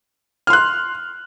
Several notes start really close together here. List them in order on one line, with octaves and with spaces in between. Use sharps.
F6 C6 F#6